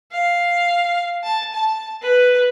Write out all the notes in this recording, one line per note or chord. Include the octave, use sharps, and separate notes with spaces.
F5
A5
A5
B4